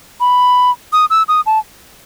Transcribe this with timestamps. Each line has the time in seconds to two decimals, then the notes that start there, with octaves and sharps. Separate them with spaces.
0.20 B5
0.93 D#6
1.10 E6
1.28 D#6
1.46 A5